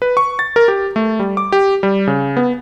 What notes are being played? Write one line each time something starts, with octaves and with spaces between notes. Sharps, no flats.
B4
C#6
A6
A#4
G4
A3
G3
D6
G4
G3
C#3
B3